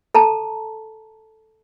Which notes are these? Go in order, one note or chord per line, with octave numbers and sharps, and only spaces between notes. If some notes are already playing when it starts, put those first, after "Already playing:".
A4 A5 A#5